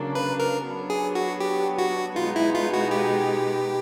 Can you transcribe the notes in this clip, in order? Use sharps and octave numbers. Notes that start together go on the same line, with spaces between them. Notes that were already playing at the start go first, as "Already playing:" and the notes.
Already playing: C#3 F#3 A#3 D4
B4
A#4
F#3 B3 D4
G#4
F#4
G4
F#4
B2 G#3 B3 D#4 F4
E4
F4
F#4
G4